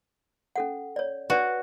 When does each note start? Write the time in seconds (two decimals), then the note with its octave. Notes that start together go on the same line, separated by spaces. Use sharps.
0.56 C#4 A4 F#5
0.96 C#5 D5
1.30 D4 F#4 B4 D5